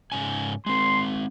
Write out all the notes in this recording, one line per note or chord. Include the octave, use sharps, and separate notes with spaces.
G#2 C#3 G#5
G#3 C4 C6